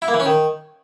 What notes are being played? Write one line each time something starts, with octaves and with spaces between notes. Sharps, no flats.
E4
A#3
E3
C#4
D#3